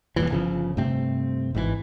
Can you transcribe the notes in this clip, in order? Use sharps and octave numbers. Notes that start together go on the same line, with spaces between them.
E1 G2 A#2 E3
G1 C#3 F3
G2 C3 A3 C4
G#1 G#2 C3 E3